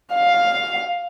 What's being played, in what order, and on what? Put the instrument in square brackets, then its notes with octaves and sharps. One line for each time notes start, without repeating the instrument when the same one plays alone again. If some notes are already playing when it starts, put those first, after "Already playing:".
[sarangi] F5